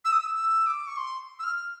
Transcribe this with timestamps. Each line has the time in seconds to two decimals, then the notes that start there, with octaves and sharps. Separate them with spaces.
0.05 E6
0.12 D#6
0.20 E6
0.35 E6
0.67 D6
0.87 C#6
0.97 C6
1.39 E6
1.44 F6
1.56 F6